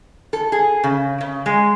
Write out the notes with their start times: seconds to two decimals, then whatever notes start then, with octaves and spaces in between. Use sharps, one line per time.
0.33 A4
0.52 G#4
0.84 C#3
1.21 C#3
1.46 G#3